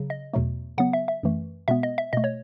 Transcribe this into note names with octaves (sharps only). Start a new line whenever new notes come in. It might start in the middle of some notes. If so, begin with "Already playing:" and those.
Already playing: C#3 F#3
D#5
E2 B2 F#3 A3
C#3 F#3 B3 F#5
E5
E5
F#2 E3 A3
B2 G#3 B3 E5
D#5
E5
B2 A3 D#5
C#5